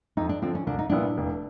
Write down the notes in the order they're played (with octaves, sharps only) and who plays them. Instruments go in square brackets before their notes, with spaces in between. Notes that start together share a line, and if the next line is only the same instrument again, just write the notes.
[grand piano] F2 [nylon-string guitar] D#4
[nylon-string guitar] D4
[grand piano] D3 F3 [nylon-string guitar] C4
[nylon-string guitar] C#4
[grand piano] C2 [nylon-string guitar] D4
[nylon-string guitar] D#4
[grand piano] A#2 G3 B3 E4 [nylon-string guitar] D4
[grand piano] F1